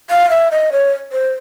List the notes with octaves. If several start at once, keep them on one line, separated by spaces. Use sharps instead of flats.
F5
E5
D#5
C#5
C5